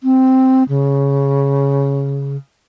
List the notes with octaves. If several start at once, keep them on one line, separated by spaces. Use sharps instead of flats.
C4
C#3